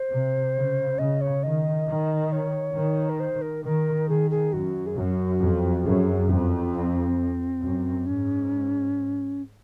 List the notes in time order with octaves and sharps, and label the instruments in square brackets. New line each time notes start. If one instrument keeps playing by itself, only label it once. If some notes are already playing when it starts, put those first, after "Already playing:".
Already playing: [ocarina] C5
[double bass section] C3
C#3
[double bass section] C#3 [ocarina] D#5
[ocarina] C#5
[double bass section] D#3 [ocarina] D#5
[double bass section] D#3
[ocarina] C#5
[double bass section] D#3
[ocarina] A#4
C5
A#4
[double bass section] D#3 [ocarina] A#4
[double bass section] D#3 [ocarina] G#4
[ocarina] G#4
[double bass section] F#2 [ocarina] F#4
[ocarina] G#4
[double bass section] F#2 [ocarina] F#4
[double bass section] F2
[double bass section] F#2 [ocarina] G#4
[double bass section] F2 [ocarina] C4
[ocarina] C4
[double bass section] F#2
[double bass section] G#2 [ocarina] C#4